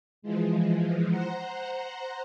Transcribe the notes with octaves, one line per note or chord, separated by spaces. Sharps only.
E3 F3 G#3
C5 F#5 A#5